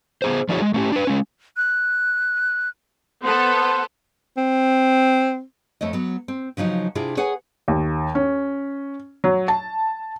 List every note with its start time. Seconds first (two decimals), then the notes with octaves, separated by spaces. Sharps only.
0.22 B3 G#4 C5
0.49 F3 D4 E4 F#4 G#4 C#5
0.62 G#3
0.74 A3 C#4 G4
0.92 D4 B4
1.07 G#3 C#4
1.57 F#6
3.24 B3 A4 C5
4.37 C4
5.81 F2 A3 C#5 D#5
5.93 F#3 B3
6.28 C4
6.57 C#3 F3 F#3 D#4
6.95 C3 D4 E4 F4 G#4
7.17 G#4 B4 C#5 F#5 G#5
7.68 D#2
8.15 C#4
9.24 F#3
9.48 A5